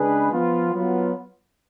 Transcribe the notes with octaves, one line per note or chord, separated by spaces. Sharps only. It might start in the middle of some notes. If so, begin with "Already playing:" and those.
Already playing: C#3 G#3 D4 G#4 B4
F3 B3 F4
F#3 B3 F4